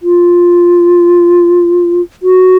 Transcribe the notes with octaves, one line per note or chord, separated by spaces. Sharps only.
F4
F#4